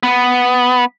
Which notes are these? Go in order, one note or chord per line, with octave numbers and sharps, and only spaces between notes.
B3